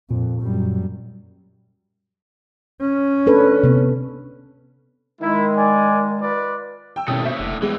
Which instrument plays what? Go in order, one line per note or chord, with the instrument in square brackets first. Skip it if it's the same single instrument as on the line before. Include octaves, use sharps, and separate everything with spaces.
[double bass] F2 [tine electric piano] A#2
[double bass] F#2 G3
C#4
[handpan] D4 A4 B4
C3 B3
[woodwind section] D#3 G#3 [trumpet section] E4
[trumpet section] D5 G#5
F4 B4 D5
[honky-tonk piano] G5 E6
[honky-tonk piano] G#1 C#4 D#6 [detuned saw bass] B2 [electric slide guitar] E4 G4 A4
[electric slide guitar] A#3 C5 C#5 [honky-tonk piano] E5
[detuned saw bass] F1 [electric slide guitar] A2 D3
[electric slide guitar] F2 A2 E3 [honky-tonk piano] G#3 [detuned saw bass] B3